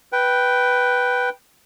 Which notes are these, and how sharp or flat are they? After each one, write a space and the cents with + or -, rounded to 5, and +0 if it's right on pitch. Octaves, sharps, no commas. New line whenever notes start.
B4 +0 G5 -10